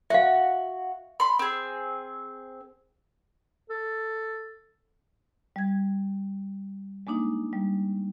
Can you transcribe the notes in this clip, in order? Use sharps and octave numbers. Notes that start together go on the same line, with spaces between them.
F#4 E5 F5
B5 C6
C4 G#4
A4
G3 G#6
G#3 A#3 D4 D#4
G3